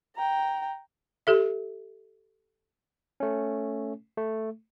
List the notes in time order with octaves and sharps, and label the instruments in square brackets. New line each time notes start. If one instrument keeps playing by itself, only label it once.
[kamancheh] G5 A#5
[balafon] G4 A4 E5
[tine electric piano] A3 C#4
A3